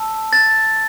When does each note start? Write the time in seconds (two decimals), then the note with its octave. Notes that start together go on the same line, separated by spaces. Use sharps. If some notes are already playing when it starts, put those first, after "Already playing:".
Already playing: A5 E6
0.33 A6